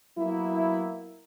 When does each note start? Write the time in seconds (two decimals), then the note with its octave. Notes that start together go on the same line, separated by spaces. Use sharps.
0.18 F#3 A#3 B3 E4